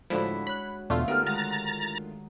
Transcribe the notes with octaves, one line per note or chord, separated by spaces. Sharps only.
A2 D3 F3 G#3 D4 E4 F#4
C#5 B5 F#6
E2 B2 D3 A3 F4
B3 D#4 G4 A4 A#4 F6
D#3 G#3 F#5 A#5 A6